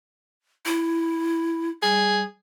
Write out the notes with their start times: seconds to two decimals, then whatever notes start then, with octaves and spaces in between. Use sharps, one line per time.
0.66 E4
1.82 G3 G#4